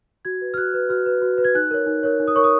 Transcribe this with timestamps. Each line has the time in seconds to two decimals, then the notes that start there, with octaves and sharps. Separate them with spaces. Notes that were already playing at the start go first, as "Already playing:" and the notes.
0.25 F#4 G#6
0.41 B4
0.54 F6
0.57 F#4 F#6
0.74 B4
0.89 F#4 F6
1.06 B4
1.22 F#4
1.38 B4
1.44 G#6
1.55 D#4 F#6
1.71 A#4 C#5
1.86 D#4
2.03 A#4 C#5
2.20 D#4
2.28 D#6
2.35 A#4 C#5 C#6
2.44 D#6